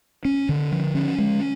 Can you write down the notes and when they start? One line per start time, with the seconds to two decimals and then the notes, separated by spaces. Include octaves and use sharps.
0.25 C#4
0.49 D3
0.72 F3
0.95 C#4
1.18 G#3